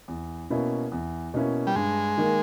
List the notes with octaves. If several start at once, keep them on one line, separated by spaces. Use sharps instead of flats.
E2
B2 A#3 C#4 E4
E2
B2 A#3 C#4 E4
G3
G2 G#3
D#3 A#3